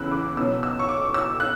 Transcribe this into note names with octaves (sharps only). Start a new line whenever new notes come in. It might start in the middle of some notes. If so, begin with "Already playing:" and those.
Already playing: E2 C#3 B5 E6 F#6
D6
B2 F#3 B3 E6
E6
C#6
D6
E6
F#6